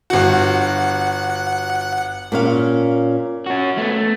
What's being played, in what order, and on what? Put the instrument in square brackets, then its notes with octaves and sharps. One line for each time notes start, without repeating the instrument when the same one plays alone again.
[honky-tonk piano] G1 F#4 [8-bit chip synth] F#5
[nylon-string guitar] A#2 C#4 F5
[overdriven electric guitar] C#4 F#4
A3 B3
A3